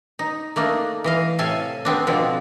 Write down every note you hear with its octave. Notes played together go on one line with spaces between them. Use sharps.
D#4
A3 A#3 D4 D#4
E3 D#5 F5
A2 C3 A4 F5 G#5 A5
B3 C4 D4
B2 D3 F3 C4